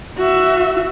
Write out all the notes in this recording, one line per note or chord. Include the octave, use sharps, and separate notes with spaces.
F#4 E5